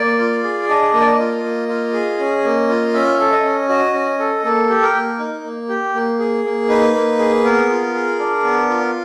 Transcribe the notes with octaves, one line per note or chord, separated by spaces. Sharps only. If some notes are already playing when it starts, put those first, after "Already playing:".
Already playing: A#3 D5
F4
G#4
D4 D#5
A#3
D5
D#5
F4
A#3
F4
G#4
C#4
A#3
F4
C#4 E5
A4
D#5
C#4
F#4 D#5
C#4
A4
A#3 A4
G4
A#4
A#3
D#4
A#3
G4
A#3
G#4
A#3
D#4 B4
A#3
G#4
B3 A#4
F4
G#4
D4
B3
F4